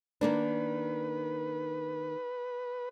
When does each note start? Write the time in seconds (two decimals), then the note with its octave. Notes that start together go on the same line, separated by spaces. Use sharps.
0.21 D#3 A#3 D4 B4